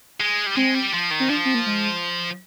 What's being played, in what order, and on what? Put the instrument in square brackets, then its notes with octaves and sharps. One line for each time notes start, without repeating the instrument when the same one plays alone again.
[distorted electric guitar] G#3
G3
[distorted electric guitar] G#3 [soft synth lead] C4
[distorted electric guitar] G3
F3
D#3
[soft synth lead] C4
[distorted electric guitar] F3 [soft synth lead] D4
[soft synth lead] C4
A#3
G#3